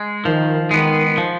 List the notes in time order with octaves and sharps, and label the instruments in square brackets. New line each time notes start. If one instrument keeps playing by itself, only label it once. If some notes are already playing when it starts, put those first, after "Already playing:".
Already playing: [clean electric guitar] G#3
[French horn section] D#3 [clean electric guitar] F3
[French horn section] D#3 [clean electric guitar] G#3 B3
[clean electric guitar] F3